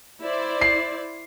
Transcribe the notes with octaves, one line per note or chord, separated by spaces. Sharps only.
E4 C5 D5
C7